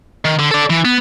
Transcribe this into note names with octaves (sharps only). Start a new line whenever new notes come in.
D#3
D3
A4 D5
E3
B3